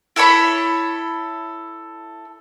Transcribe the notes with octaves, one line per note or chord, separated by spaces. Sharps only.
E4 A4 C#5 B5